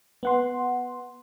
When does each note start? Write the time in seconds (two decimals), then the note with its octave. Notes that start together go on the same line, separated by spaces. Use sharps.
0.23 B3 F#5 C6